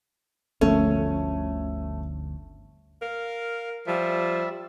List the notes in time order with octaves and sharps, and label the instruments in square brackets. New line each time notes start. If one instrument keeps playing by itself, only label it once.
[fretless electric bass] G1 D2 F3 [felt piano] A3 [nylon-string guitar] C#4
[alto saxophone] A#4 [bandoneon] F5
[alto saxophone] F3 [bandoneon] G3 E5